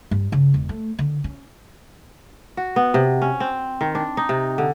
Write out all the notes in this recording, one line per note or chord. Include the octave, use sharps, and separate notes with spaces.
G2
C#3
E1
A3
D3
C#4
F#4
B3
C3
C#4
C4
D#3
D4
D#4
C3
D3